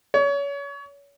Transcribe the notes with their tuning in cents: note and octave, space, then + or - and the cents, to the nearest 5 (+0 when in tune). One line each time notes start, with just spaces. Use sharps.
C#5 +30